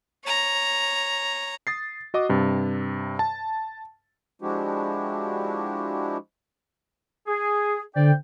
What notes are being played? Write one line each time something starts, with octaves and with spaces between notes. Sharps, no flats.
C#5 A#5
D#6 A6 C7
F#4 D#5 D6 D#6
G2 C3
A5
F3 G#3 D4 E4 F#4 G4
G#4
D3 C5 D5 G5